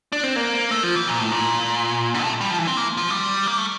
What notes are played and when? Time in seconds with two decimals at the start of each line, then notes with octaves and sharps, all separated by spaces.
0.12 D4
0.23 C4
0.36 A#3
0.71 A3
0.83 F3
0.96 E3
1.07 A#2
1.19 A2
1.31 A#2
2.14 D3
2.23 A3
2.41 G3
2.50 F3
2.58 E3
2.67 C4
2.77 A#3
2.97 F3
3.10 G3
3.47 A#3
3.58 A3